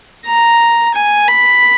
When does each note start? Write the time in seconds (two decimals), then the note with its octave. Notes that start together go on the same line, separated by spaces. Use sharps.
0.26 A#5
0.94 G#5
1.28 B5